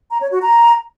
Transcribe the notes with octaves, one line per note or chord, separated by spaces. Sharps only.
A#5
C#5
F#4
A#5